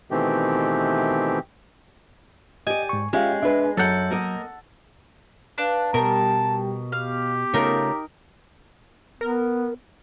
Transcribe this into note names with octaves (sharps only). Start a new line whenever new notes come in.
B2 D#3 E3 A3 C4 G4
G4 D5 D#5 G#5
G#2 C#6
G#3 C#4 F4 G4 E5 F5
D4 B4 E5
F#2 F#3 A4 F#5 G6
A#3 A#4 D#5
D4 B4 F5 A5 F#6
B2 G3 G4 A#4 G5 A5
B3 G4 F5
C#3 A3 D#4 F4 A#4
B3 A#4